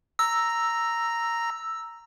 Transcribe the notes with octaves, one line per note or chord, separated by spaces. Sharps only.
A#5 E6 A#6